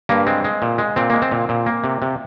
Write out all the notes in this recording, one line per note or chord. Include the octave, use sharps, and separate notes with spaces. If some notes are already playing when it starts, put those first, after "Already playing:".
G2 A#3
G#3 C4
G#3
A#2
G#3
A#2 C4
G#3 A#3
C4
A#2
A#2
A#3
C3
C3